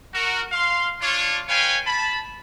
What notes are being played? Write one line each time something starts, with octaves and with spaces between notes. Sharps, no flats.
F#4 A#4
F5 C6
D4 F4 C#5
F4 B4 C#5 F5 G5 G#5
A5 B5